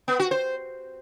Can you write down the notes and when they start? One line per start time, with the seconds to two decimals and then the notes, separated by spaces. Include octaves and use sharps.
0.08 B3
0.19 F#4
0.31 C5